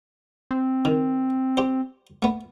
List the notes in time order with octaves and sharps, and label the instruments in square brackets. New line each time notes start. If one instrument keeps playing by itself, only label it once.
[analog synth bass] C4
[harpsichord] D#3
G4 C5
A3 B3